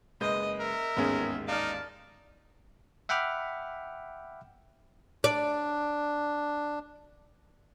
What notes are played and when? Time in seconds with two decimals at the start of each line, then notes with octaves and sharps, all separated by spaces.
0.21 F#1 G#3 B4 D#5 G6
0.60 A#4 E5
0.97 A1 D#2 G#2 B3 C#4 G#4
1.48 D#4 D5 F5 A5 F6
3.09 E5 F#5 G5 B5 D6 F6
5.24 D4 D5